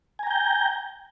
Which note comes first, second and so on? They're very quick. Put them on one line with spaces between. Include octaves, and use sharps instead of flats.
G#5 A#5 G5 G6